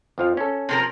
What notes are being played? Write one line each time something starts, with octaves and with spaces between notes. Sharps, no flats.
F2 F3 F5
C#4 A4
C3 F3 A#4